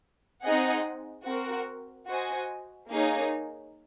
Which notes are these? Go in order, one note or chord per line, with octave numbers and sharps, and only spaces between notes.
C4 D#4 G#4 D#5 F#5
C4 F#4 A#4
F#4 C5 D#5 G#5
A#3 D#4 G#4 C#5